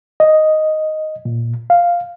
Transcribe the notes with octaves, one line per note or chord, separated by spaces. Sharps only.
D#5
A#2
F5